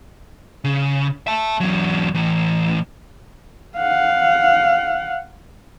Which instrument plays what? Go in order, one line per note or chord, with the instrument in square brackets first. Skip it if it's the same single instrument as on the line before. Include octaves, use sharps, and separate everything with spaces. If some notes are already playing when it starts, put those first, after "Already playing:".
[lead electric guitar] C#3
E5 A5
E2 F#3
A2 E3
[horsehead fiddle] F5 F#5